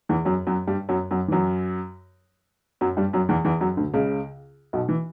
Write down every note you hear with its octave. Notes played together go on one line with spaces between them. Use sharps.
E2 E3
F#2 F#3
F#2 F#3
G2 G3
F#2 F#3
F#2 F#3
E3
F#2 F#3
F#2 F#3
G2 G3
F#2 F#3
E2 E3
E2 E3
F#2 F#3
D2 D3
C#2 C#3
B1 B2
E3